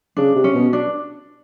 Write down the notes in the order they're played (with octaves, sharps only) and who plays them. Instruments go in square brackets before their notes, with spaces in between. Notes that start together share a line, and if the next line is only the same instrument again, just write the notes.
[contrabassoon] C#3 [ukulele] D4
[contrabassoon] C3
[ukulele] C#4
[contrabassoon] B2
[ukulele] D4